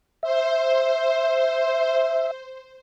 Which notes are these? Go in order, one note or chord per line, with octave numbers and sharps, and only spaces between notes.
C5 E5